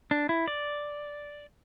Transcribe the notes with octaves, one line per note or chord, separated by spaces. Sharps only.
D4
E4
D5